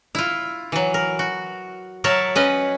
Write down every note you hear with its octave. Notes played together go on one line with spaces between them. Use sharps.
E4 F4
E3 F#3
A#4
F#4
F#3 A#4 C#5 E5 A5
C#4 B4 D#5